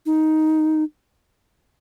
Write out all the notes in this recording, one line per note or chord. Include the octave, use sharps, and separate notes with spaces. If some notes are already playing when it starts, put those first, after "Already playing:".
D#4